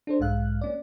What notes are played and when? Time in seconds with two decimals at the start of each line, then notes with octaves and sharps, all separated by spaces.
0.07 D4 A4 C5
0.19 B1 G#2 G#3 F5 F#6
0.61 A#3 C#4 D5